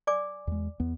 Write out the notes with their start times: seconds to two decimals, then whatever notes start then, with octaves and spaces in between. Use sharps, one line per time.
0.07 D5 G#5 D6
0.47 E2 G#3
0.80 E2 B3